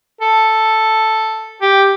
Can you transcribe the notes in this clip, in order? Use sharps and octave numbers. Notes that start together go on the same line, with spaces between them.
A4
G4